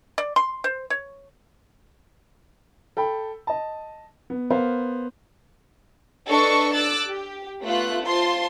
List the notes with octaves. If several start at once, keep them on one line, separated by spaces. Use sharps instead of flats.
D5
C6
C5
C#5
A4 G5 B5
D#5 A5
B3
B3 A#4 C5 F5
D4 A4 B4 D#5 A5 C#6
D6 E6 F#6 A6
G4
A3 B3 F4 F#6
F4 C5 A5 C6